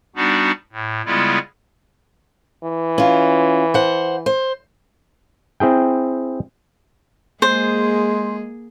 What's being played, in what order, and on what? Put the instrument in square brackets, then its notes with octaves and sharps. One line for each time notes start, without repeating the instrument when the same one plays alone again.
[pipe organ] G3 B3 D4 D#4 F#4
A2
C#3 G3 G#3 B3 E4 F4
[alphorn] E3
[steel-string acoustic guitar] C#4 F4
C5 F#5
C5
[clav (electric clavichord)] C4 E4 G#4 G5
[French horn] G#3 [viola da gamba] A#3 G#4 [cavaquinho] C5